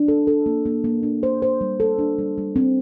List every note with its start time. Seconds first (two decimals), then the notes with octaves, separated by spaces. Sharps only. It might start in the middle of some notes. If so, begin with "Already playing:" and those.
Already playing: D4
0.08 A4
0.27 A4
0.46 A#3
0.65 A#3
0.84 A#3
1.03 D4
1.23 C5
1.42 C5
1.61 G3
1.80 A4
1.99 D4
2.19 G3
2.38 G3
2.56 C4